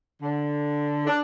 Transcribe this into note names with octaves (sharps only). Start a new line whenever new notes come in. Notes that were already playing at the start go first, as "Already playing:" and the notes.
D3
D4